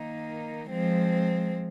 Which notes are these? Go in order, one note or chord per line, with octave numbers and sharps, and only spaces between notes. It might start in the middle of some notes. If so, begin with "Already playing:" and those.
Already playing: D#3 A#3 D#4
F3 G#3 C4